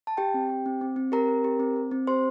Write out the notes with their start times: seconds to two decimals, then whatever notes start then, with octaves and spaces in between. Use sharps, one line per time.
0.07 A5
0.17 G4 G5
0.34 C4
0.49 G4
0.66 C4
0.81 C4
0.96 C4
1.12 G4 A#4 A#5
1.28 C4
1.44 G4
1.60 C4
1.76 C4
1.91 C4
2.07 G4 C5 C6